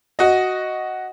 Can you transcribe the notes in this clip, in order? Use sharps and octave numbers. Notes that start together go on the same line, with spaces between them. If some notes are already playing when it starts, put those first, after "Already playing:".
F#4 D#5